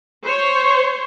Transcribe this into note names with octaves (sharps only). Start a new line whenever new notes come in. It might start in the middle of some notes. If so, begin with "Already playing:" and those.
C5 C#5